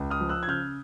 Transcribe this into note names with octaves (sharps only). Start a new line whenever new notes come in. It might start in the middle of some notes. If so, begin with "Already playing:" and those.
Already playing: C#2
D#6 F6
F3
E6 F#6
G#6
C#3 F6 G6